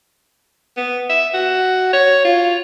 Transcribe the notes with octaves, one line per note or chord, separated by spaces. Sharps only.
B3
E5
F#4
C#5
F4